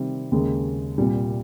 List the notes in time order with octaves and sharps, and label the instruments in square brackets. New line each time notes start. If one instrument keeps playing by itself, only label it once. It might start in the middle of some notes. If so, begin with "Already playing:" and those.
Already playing: [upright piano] C3 D#3 G3 C4
D#2 C#3 G#3
C2 A#2 G3